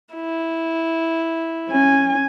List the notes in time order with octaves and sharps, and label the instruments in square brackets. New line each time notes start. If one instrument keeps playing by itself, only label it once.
[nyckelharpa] E4
[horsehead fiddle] C#4 G#5